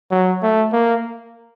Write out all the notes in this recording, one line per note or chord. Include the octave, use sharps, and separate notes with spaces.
F#3
A3
A#3